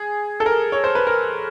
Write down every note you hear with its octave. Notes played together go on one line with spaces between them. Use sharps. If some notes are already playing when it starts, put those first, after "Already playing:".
Already playing: G#4
A4
A#4
C#5
C5
B4
A#4